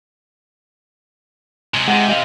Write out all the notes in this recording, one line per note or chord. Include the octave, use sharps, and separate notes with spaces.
C3 G#3
C3 G#3 G#4 E5 F#5
G4 D#5 F5